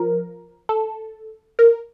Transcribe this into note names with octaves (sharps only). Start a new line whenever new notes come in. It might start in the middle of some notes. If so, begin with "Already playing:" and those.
Already playing: F3 A#4
A4
A#4